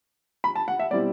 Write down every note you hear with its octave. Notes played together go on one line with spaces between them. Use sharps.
B5
A5
F#5
E5
B2 G3 C4 E4 D5